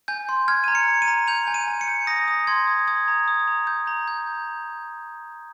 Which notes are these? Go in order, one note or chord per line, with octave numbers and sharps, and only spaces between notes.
G#5 G6
C6
F6 G#6
A#5 D#7
C#7
A#5
D#7
A#5
G6 F7
G#5
D#7
G#5
C#7
G6
D#6 A#6
D#6
C6 G#6
D#6
D#6 G#6
A#5
D#6
A#5
G6
A#5
G6